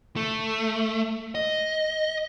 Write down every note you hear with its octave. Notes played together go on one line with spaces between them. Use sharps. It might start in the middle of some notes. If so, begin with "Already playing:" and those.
A3
D#5